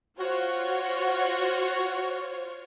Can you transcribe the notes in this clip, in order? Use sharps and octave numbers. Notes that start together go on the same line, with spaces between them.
F4 F#4 C5 C#5